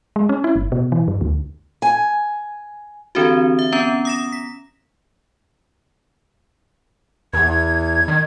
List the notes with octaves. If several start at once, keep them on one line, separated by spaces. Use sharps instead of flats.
G#3
C#4
E4
G1
B2
E3
G2
D2
G#5
D3 E3 C4 D4 F#4
E5
B3 C#4 A#5
D#6 A#6 E7
B6
E2 G#6
D#3